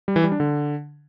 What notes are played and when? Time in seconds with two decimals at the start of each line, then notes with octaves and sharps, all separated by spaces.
0.08 G3
0.16 E3
0.24 G3
0.32 D4
0.40 D3